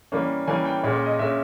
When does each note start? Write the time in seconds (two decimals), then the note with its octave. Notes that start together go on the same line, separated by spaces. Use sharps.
0.12 E3 G3 A#3 C#4
0.47 E3 G3 A#3 C#4 G#5
0.65 G5
0.83 A#2 G#3 C#4
0.93 C#5
1.06 D#5
1.19 A#2 G#3 C#4 E5